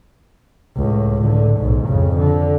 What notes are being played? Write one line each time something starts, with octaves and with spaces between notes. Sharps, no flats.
C#2 A2
A2 D3
B1 G#2
F2 C#3
D3